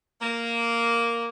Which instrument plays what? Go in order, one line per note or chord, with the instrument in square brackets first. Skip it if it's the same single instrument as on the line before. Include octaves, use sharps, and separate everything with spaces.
[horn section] A#3